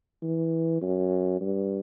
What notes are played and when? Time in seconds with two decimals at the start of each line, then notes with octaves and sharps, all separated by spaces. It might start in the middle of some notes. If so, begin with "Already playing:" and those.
0.22 E3
0.81 F#2
1.41 G2